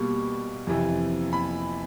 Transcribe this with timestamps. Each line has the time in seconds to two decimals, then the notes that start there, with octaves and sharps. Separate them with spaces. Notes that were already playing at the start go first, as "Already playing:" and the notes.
Already playing: B2 G3 A#3 C#6
0.67 F2 C3 E3
1.33 B5